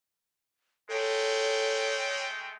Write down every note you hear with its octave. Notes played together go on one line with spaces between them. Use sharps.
G#3 A3 A4 C#5 G5